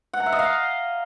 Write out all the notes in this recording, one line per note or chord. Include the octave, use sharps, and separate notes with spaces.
F#5
A#5
E5
D#5
F5